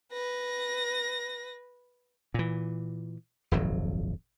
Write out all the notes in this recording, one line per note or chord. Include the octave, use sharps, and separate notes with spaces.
B4 A#6
A#2 E3
D#1 G#1 F2 F#3